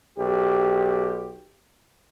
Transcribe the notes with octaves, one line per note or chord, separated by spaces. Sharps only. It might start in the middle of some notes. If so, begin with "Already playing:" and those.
B1 G4